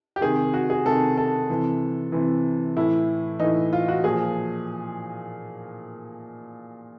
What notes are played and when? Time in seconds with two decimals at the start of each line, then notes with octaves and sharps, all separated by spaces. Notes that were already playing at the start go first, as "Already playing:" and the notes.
0.16 G4
0.21 C3 D#3 G#4
0.54 F#4
0.70 G#4
0.85 C3 D#3 A4
1.17 A4
1.50 C3 E3
2.12 C3 E3
2.77 A2 E3 E4
3.40 A2 E3 D#4
3.73 F4
3.88 F#4
4.04 A#2 F3 G#4